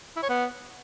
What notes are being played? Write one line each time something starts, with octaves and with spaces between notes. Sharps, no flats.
E4
C#5
B3